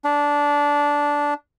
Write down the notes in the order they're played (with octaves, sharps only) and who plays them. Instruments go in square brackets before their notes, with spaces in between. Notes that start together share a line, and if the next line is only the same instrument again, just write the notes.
[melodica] D4